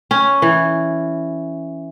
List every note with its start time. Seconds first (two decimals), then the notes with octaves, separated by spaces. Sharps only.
0.11 C#4
0.42 E3